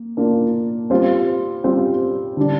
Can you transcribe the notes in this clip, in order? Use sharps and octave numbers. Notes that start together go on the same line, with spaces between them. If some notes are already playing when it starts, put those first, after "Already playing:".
Already playing: A#3
A#3 D4 F4 A#4
G3 C4 F4 C5
G3 C4 F4 C5
D3 G3 D4